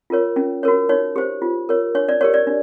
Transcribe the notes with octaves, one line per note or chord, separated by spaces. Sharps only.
F4 A#4 C#5
C#4
F#4 A#4 C#5
D#4 C#5
G4 C5
F4
A#4 C#5
D4 C#5
D5
G4 A#4 C#5
D5
D4